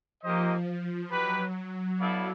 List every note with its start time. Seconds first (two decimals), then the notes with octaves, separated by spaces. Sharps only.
0.22 F3 A#3 D#4 G4 C5 D#5
1.10 F#3 D#4 G4 B4
1.54 F#3
1.99 B3 E4 A4 D5 F5